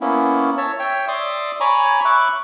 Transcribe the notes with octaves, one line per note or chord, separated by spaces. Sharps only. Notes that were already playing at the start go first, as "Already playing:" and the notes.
A#3 B3 C#4 E4
C#5 E5 A5
C#5 E5 G5
D5 E5 C6 D6 D#6
C#5 G#5 A#5 B5 C#6 D6
E5 B5 C#6 D6 F#6